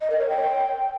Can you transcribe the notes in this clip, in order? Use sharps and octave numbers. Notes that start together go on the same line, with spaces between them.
D#5
A#4
C#5
G5